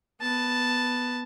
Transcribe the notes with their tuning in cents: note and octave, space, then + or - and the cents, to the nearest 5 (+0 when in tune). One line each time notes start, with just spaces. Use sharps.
B3 +0 A5 +0